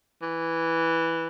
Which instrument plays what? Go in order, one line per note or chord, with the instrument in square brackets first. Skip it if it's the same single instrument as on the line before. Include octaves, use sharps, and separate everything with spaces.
[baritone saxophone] E3